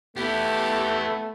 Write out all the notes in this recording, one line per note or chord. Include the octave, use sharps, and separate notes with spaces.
A3 B3 E4 G4